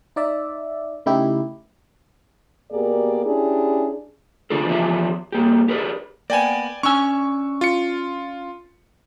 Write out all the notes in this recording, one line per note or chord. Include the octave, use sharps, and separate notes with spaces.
D#4 D5 E5
C#3 A3 D#4 E4 G4
B2 A#3 G4 G#4 A#4 D5
C#4 D4 E4 G4 G#4
D3 A3 D4 F4 A4
E3 F3 B3 F4 G4 E5
G2 A#3 G4
G4 A#4 B4 D5
A#3 B3 D5 G5 G#5
C#4 D4 G#5 C#6 E6
F4 C#7